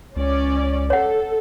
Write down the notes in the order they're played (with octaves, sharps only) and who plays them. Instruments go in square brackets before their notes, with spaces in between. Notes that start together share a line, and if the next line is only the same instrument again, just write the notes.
[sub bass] C#2 [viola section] C#4 D5
[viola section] A4 [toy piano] C#5 F#5